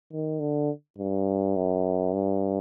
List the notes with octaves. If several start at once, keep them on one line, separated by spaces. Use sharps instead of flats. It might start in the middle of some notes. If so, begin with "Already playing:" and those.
D#3
D3
G2
F#2
G2